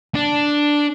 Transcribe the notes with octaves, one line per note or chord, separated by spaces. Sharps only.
D4